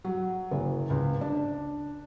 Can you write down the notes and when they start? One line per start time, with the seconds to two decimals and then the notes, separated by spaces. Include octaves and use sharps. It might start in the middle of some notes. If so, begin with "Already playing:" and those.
0.05 F#3
0.51 F#1
0.90 C#2
1.21 D4